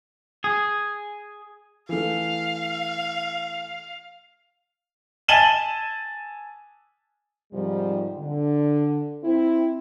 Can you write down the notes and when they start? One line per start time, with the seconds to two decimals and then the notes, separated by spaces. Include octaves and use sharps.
0.44 G#4
1.89 E3 A3 F5
5.28 G#5 A5 D#7 E7 F#7 G7
7.53 G#2 C3 D#3 F3 G3
8.17 D3
9.23 C4 E4